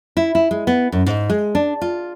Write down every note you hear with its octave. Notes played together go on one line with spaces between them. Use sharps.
E4
E4
G#3
B3
F#2
G#2
G#3
D4
F4